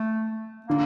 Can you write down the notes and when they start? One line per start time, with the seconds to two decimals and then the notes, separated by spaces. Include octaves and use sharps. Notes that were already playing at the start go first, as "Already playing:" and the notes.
Already playing: A3
0.67 D3 A#3